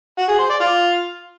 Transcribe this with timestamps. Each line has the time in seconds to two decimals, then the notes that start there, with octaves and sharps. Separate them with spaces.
0.18 F#4
0.29 G#4
0.39 C5
0.50 D5
0.60 F4